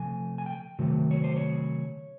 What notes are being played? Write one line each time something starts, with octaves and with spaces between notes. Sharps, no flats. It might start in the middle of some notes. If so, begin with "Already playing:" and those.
Already playing: C3 F3 A3 G#5
G#5
G5
C3 D#3 F#3 A3
C#5
C5
C#5